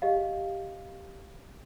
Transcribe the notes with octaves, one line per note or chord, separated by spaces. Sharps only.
G4 D#5 F5